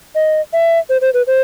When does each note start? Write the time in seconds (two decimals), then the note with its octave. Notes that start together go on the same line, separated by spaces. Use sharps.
0.15 D#5
0.53 E5
0.89 C5
1.01 C5
1.14 B4
1.27 C5